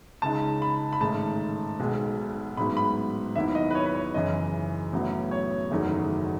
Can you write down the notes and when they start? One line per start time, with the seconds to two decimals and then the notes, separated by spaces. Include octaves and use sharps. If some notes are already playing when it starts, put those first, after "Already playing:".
0.22 C#2 C#3 G#3 D#4 A5
0.62 B5
0.93 B5
1.01 A1 G#2 D#3 A3 D#4 A5
1.79 B1 B2 G#3
2.57 A1 G#2 F#3 B3 B5
2.77 B5
3.36 D#2 D#3 F#3 B3 E4 E5
3.55 D#5
3.70 B4
3.75 C#5
3.86 B4
3.95 C#5
4.14 F#1 F#2 E3 D#5
4.93 A1 A2 F#3 B3
5.31 C#5
5.70 F#1 E2 D#3 F#3 A3